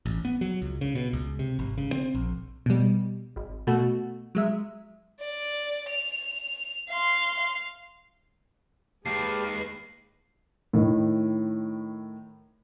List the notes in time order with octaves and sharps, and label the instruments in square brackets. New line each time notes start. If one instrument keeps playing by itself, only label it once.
[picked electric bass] A1
B3
F#3
C#2
C#3
B2
C#2
C3
G#1
C#3
C4
A#1
[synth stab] B2 G3
G#1
B2 A3 F#4
F#3 G#3 E5
[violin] D5
F7
F5 C6
F5
[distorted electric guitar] D#2 D#3 [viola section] G#3 B4 [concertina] G4 F5 A5 [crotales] C7
[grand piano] A2 D#3